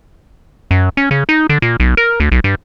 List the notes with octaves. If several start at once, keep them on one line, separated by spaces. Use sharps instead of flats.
F#2
C#4
C#3
D#4
D3
A#2
B1
A#4
D2
B1
G2